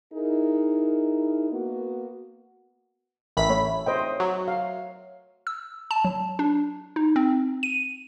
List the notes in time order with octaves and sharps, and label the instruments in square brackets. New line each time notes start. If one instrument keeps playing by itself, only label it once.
[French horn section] D#4 E4 G#4 A#4
A#3 B3 F#4
[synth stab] A1 B5 B6 [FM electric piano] A#4 E5
[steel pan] A3 [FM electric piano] C#5 E5
[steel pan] C5 D#5 G5
[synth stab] F#3
[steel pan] F5
[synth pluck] E6
A5
F#3
D4
D#4
C4
D#7